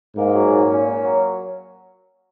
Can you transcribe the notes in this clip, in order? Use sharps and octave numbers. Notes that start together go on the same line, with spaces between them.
G#2 A#3
F#3
A#2
C#4
A#3
F#3